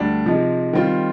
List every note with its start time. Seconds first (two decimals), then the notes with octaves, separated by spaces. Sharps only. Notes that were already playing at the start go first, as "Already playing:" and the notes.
Already playing: D2 G3 D4
0.26 C3 F3 G#3 D#4
0.73 D#3 G3 C4 F4